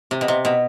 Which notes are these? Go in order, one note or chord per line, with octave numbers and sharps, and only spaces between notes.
C3
B2
C3
B2